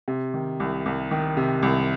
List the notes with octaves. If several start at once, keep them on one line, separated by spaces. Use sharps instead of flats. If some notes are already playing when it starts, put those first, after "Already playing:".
C3
D#3
C2
C2
D#3
C3
C2